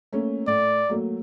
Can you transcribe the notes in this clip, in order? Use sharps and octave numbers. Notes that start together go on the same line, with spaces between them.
A3 A#3 C#4
A2 D5
F#3 A3 A#3